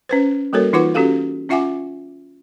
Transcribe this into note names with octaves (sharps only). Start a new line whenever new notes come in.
C#4 B4 C5
G3 A#3 F#4 A4 A#4 C#5
E3 D#4 F4 B4 F#5 D6
C#4 F#4 G4 A4 F5
C#4 F4 E5 F#5 G#5 D6